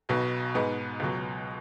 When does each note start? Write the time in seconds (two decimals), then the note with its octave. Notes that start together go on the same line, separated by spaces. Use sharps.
0.09 B1 B2 B3
0.55 G#2 G#3 B3
1.00 C#2 B2 F#3